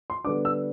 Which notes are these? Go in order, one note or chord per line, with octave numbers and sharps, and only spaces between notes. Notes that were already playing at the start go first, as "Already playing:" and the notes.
C6
D3 G3 B3 D4 D6
E6